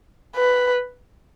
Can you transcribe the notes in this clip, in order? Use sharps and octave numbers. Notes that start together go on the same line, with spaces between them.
B4